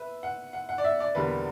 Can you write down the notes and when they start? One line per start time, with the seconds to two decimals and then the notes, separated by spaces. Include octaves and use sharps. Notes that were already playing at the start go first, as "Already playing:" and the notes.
Already playing: B4 E5
0.23 F#5
0.53 F#5
0.69 F#5
0.78 D5
0.84 E5
1.00 D5
1.15 E1 E2 D3 G3 A#3 B4